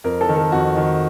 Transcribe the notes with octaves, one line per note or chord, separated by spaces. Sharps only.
F2 A#4
A4
D#3
A4
F2 F#4
D#3